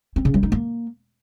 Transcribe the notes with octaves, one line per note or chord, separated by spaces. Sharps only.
C4
C#3
G3
D#4
A#3